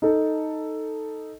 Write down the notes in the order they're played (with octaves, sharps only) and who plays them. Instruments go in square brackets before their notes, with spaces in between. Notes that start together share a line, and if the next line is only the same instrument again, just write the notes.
[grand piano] D#4 A4